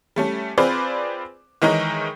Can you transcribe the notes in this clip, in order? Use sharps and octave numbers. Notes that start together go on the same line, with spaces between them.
G3 A3 C#4
C4 F4 G#4 B4 C5 D5
D#3 E3 G#3 D#4 A#4 C#5